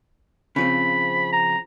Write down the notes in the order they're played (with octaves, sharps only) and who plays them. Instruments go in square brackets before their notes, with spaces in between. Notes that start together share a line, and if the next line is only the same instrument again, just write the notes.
[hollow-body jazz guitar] C#3 F3 C4 [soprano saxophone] B5
[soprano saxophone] A#5